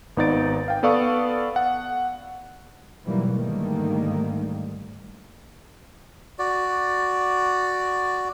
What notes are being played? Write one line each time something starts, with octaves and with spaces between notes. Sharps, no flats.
G#1 B3 D#4 D5 A6 D7
F5 G5
B3 A4 D5 F5 C#6 D#6
F#5
G#2 B2 E3 F#3 G3 A#3
G#2 D3 D#3 G3 A3 A#3
F#4 D5